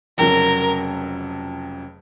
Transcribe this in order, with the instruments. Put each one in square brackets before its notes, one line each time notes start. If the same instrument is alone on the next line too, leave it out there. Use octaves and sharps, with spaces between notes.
[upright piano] F1 F2 C#3 F#3 [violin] A#4